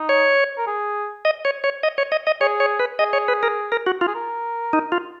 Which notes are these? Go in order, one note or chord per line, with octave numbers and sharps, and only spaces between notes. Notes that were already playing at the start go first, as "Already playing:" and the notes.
Already playing: D#4
C#5
A#4
G#4
D#5
C#5
C#5
D#5
C#5
D#5
D#5
G#4 C#5
C#5
B4
G#4 D#5
C#5
B4
A#4
A#4
F#4
F4
G#4
A#4
D#4
F4